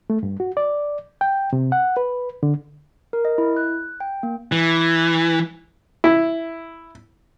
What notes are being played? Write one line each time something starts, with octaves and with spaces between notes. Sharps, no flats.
A3
G2
F#4
D5
G5
C3
F#5
B4
D3
A#4
D#5
E4
F#6
G5
A#3
E3
E4